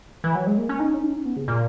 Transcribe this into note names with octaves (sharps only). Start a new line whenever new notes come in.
E3
F#3
G#3
A#3
C#4
D#4
C#4
D#4
C#4
B3
C#3
A#2